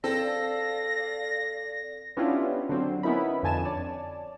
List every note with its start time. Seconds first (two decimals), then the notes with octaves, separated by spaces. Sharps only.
0.04 C4 A4 D5 F5 A#6
2.17 B3 C#4 D4 E4 F4 G4
2.69 D3 F#3 C4
3.03 B3 C#4 D#4 E4 A#4 B5
3.43 F2 D3 G#5 A5 E7
3.65 C#5 D5 A5